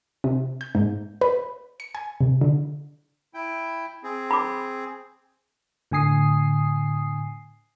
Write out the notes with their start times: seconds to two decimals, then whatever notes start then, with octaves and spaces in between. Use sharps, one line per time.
0.24 C3
0.61 G6
0.75 G#2
1.21 B4
1.80 C#7
1.95 G#5
2.21 C3
2.41 D3
3.34 E4 G5
4.03 C4 G#4
4.31 B5 D6
5.91 A2 D3 G#5 D#6 C7